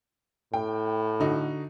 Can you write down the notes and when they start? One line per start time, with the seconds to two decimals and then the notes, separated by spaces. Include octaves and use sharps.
0.54 A2 G5
1.20 D3 D#4 F#4